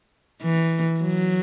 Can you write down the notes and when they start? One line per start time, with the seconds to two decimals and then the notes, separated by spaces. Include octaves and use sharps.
0.42 E3
1.01 F#3